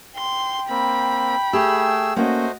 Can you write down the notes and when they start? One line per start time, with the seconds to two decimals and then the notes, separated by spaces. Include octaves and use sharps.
0.16 G5 C6
0.70 A#3 C4 B5
1.53 A3 G4 G#4 E6
2.16 A3 A#3 C#4 F#4 C5 D#5